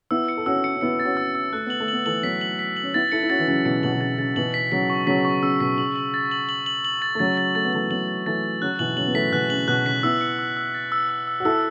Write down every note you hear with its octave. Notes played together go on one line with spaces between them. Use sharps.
B3 E4 E6
C#7
A4
C#4 F#4 E6
C#7
C#4
B3 E4 C#7
A6
C#4 F#4
E6
E6
A3 F#6
B3 F#7
A3
B3 F#7
E3 A3 F#7
F#3 B3 B6
F#7
B6
F#7
C#4
B3 E4 A6
E4 A4 C#7
E4
C#4 F#4 A6
E3
C#3 F#3 A6
B2 E3 C#7
B2 F#7
B2
C#3 A6
C#3 A6
B2 E3 F#7
B6
C#3 F#3 B6
C#6
C#3 F#3 B6
C#6
C#3 E6
B2 B6
C#3 F#7
F#7
A6
F#7
F#7
F#7
F#7
A6
A3
C#3 F#3 A6
A6
A3 A6
B3
E3 A3 A6
F#3 B3 F#7
A6
E3 A3 A6
A6
C#3 F#3 F#6
B2 E3 F#7
C#3 F#3 F#7
B3
E3 A3 B6
B2 E3 F#6
C#3 F#7
B2 F#6
C#3 B6
B3 E4 E6
C#7
E6
E6
A6
E6
E6
E6
F#4
E4 A4 E6